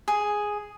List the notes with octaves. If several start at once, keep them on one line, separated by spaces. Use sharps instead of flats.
G#4